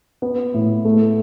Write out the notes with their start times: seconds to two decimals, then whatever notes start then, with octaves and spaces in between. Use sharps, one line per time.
0.22 B3
0.54 A2
0.85 A3